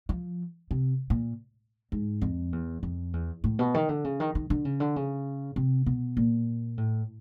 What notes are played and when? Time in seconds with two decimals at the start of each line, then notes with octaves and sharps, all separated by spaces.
0.09 F3
0.71 C3
1.10 A#2
1.92 G#2
2.22 F2
2.52 E2
2.83 F2
3.13 E2
3.44 A2
3.59 B2
3.74 D#3
3.89 D3
4.04 C#3
4.20 D#3
4.35 D#3
4.50 D3
4.65 C#3
4.80 D3
4.96 C#3
5.56 C3
5.86 B2
6.17 A#2
6.78 A2